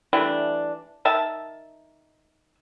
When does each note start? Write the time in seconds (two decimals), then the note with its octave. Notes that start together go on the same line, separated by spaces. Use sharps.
0.13 E3 G3 A3 D4
1.05 D#3 E5 A5